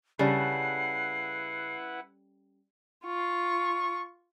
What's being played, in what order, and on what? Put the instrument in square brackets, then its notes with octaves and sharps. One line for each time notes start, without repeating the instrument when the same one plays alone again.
[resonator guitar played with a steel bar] C#3 [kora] G3 C#4 A4 [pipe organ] E4 B4 F#5 [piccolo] C7
[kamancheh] F4 C#6